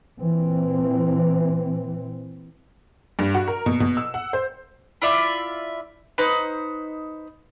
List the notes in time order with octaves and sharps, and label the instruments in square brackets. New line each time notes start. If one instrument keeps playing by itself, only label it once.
[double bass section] A#2 E3 C4
[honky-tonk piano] G2
F#4
A#4
B2
B2
E6
F#5
C5
[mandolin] E4 F4 D5 E5
D#4 B4 C5